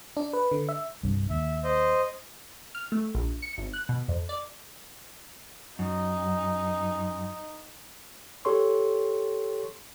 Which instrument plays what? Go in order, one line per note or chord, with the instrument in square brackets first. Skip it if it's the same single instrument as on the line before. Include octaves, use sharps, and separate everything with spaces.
[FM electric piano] D4
B4
D3
E5
[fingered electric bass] C2 G2
[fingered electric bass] D#2 [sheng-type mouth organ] E5
[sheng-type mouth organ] C5 D#5
[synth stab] F6
A3
A#1
C#7
G#1
F#6
B2
F2
D5
[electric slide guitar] F#2 [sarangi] D#4
[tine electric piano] G4 A4 C#5 C6 C#6